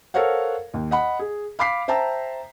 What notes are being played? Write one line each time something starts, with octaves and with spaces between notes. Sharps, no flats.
A4 A#4 C5 C#5 F5 F#5
D#2
D#5 F#5 B5
G#4
F5 B5 D6 B6 C7
C5 E5 G5 A5 A#5